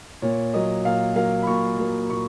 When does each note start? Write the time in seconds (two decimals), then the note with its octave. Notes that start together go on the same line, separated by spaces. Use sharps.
0.22 A#2 C#5
0.54 F#3 A#3 D#5
0.85 A#2 F5
1.15 F#3 A#3 F5
1.42 B5
1.47 A#2 C#6
1.78 F#3 A#3
2.10 A#2 C#6